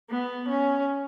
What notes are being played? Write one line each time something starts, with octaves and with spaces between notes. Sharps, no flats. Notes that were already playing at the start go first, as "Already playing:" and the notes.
B3
C#4